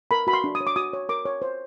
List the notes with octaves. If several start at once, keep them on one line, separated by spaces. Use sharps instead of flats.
A#4 B5
F#4 B5
C6
D4
D#6
C#5
D6
F#4 D#6
C#5
A#4 D6
C#5
C5